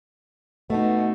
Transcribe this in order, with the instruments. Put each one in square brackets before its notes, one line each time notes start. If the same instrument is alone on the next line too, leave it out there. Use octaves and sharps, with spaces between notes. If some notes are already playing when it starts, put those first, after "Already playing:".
[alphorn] B2 [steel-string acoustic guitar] A3 D#4